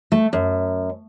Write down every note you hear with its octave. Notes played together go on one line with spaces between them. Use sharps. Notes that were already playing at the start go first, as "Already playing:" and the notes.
A3
F#2